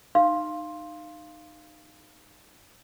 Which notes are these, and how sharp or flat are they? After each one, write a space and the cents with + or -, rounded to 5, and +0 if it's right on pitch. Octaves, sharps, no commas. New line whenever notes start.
D#4 -20 F5 -10 C6 +10